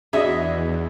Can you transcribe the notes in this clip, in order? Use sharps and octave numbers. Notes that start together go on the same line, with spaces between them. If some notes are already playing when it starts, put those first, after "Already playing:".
E2 E3 D4 F#4 G#4 D#5 E5